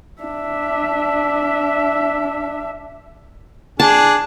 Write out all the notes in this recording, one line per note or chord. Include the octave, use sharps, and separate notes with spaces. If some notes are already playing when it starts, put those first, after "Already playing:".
D4 E5
D4 G#4 A5